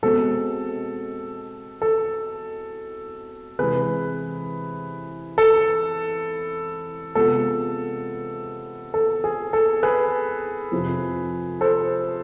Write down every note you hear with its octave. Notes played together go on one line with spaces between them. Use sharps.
B2 G#3 C4 A4
A4
C3 E3 G#3 G#4 B4
A4
C3 G#3 B3 F4 A4
A4
G#4
A4
G#4 B4
F2 C3 F3
A4 C5